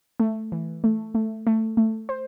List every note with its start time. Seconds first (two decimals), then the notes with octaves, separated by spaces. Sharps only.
0.20 A3
0.52 E3
0.84 A3
1.14 A3
1.47 A3
1.77 A3
2.09 C5